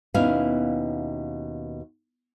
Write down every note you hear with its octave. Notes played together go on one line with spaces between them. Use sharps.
D#2 B2 B3 C#4 E4 F5